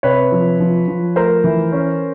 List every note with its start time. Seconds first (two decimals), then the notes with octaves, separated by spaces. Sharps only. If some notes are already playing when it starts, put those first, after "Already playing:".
0.03 C3 B4 C#5
0.32 F3
0.60 F3
0.88 F3
1.16 A3 A#4 C5
1.44 E3
1.72 C#4